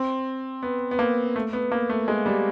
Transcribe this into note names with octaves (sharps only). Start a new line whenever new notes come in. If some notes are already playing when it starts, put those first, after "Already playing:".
Already playing: C4
B3
B3
A#3
A3
B3
A#3
A3
G#3
G3